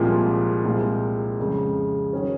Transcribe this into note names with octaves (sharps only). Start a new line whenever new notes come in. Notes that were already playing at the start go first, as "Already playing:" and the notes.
Already playing: C2 A#2 F3 G#3 C4
C2 A#2 G#3 C4
F2 C#3 G#3
D#3 F#3 C#4 G#4